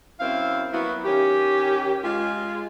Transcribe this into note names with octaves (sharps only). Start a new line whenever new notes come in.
F#2 C4 E4 F5
F#3 A#3 B3 E4 F#4
D#3 C#4 G4
G#3 F4